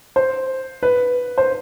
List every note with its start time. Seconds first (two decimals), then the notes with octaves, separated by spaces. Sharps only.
0.16 C5
0.83 B4
1.38 C5